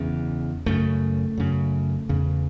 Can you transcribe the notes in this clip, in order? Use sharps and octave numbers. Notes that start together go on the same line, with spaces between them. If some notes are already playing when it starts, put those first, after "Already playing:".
Already playing: E2 C#3
F#2 C#3 A3
F#2 C#3
E2 C#3